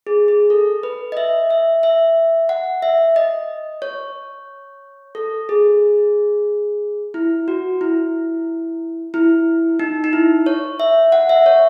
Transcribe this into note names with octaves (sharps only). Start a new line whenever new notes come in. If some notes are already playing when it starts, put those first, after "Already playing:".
G#4
G#4
A4
B4
D#5
E5
E5
E5
F#5
E5
D#5
C#5
A4
G#4
E4
F#4
E4
E4
D#4
D#4
E4
C#5
E5
F#5
E5
C#5